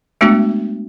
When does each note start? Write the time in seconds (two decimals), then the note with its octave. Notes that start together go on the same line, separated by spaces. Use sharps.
0.21 G#3 A3 B3 D4 F#4